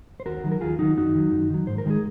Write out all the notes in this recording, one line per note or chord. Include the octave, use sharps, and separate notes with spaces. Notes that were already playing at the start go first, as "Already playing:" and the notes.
C5
D#2 F#4 A#4
D#3 F#3
A#4
D#2 F4 G#4
D#3 F#3 D#4 F#4
F#2 D#4 F#4
D#3 F#3
F#2
D#3 F#3
G#2 C5
A#4
D#3 G#3 G#4